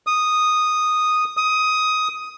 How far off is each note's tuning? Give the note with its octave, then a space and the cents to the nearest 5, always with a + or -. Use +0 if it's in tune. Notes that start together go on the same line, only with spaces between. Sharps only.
D#6 -5
D#6 +15